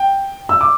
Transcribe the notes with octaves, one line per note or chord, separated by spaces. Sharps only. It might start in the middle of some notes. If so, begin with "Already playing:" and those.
Already playing: G5
E6
D6